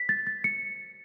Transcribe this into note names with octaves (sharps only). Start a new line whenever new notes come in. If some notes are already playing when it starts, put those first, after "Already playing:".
Already playing: B6
A6
A6
C#7